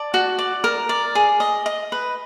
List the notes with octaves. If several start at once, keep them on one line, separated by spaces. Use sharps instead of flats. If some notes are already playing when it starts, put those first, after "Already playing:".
Already playing: D5 A5
F#4
D5
A#4
D5
G#4
D#5
D#5
B4